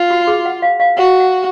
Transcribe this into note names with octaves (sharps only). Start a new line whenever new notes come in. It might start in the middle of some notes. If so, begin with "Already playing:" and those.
Already playing: F4
F#4
G#4
F#5
F5
F5
F#4 F#5
F#5